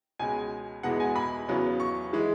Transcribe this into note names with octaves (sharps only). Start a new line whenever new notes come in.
C#2 B2 G#3 G#5
E2 B2 G#3 B3 F#5
G#5
B5
E2 C#3 F#3 B3
C#6
E3 G#3